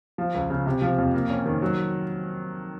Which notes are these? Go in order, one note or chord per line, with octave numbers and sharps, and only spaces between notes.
F3
C#2
C#3
C3
F3
F2
A#3
C#4
D#3
F#3